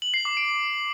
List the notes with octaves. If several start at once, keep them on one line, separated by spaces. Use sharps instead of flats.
F#7
C7
D6
D7